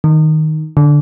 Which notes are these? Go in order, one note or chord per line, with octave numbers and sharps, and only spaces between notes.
D#3
D3